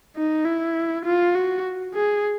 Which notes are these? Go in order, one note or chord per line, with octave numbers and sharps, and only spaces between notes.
D#4
E4
F4
F#4
G#4